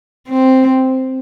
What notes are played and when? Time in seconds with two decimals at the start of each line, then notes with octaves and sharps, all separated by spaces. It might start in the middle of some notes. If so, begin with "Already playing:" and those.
0.28 C4